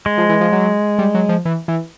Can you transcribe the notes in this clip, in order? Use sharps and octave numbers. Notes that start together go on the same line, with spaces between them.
G#3
F3
E3
F3
F#3
G3
F#3
F3
E3
E3